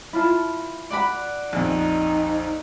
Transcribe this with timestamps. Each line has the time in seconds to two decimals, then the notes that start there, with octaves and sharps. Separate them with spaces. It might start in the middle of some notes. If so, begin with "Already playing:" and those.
0.13 E4 F4 A5
0.90 D5 F#5 B5
1.53 A#1 F2 D#4